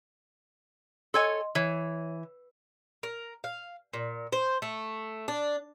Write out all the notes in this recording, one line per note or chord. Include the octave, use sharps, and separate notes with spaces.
A4 C#5 D#5 G#5 C6
E3 C#5
A#4
F5
A#2
C5
A3
D4